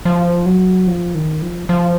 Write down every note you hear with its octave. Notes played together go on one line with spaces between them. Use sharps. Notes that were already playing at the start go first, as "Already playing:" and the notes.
F3
F#3
F3
D#3
F3
F3